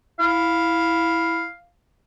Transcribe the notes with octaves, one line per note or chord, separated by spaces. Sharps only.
E4 F5